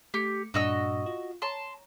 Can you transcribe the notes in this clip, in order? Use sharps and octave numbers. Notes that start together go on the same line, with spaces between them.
A3 G4 D6 C#7
G2 A#2 D4 F#4 D#5 E6
F4
C#5 A5 A#5 C6